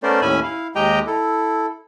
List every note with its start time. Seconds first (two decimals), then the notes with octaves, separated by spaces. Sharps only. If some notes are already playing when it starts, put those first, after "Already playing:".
0.03 A3 B3 C#4 A#4 C5 D5
0.22 D#2 A2 C#4 E5 G#5 B5
0.43 E4 F5
0.75 D#2 G#3 G4 D#5 G5 A#5
1.07 E4 A4